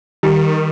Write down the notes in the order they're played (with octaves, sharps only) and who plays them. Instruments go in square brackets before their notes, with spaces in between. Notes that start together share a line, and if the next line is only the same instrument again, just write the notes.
[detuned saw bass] D#3 [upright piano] G3